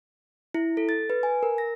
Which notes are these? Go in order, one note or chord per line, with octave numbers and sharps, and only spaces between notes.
E4
A4
A6
B4
G#5
A#4
A#6